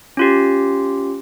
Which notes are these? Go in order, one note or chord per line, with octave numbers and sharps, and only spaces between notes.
C#4 F4 G4